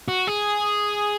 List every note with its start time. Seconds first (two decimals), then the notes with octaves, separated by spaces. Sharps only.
0.08 F#4
0.27 G#4